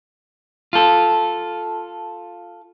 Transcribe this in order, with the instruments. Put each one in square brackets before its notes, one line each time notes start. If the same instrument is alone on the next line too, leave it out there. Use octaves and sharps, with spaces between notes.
[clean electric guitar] F4 A4